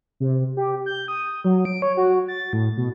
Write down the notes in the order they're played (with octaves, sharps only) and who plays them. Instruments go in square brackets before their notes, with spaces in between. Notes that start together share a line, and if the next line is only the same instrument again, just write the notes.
[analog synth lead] C3
G4
G6
D#6
F#3
D7
C#5
F#4
A6
A2
B2